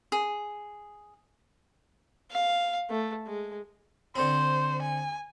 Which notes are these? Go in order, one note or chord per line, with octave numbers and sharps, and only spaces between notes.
G#4
F5
A3
G#3
D3 C4 C5
G#5